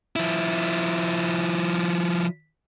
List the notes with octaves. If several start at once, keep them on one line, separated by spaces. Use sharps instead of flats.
F3 E4